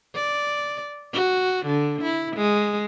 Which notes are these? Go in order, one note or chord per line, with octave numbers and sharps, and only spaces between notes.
D5
F#4
D3
E4
G#3